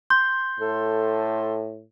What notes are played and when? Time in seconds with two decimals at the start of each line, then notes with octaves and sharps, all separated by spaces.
0.10 C6 G6
0.60 A2 A4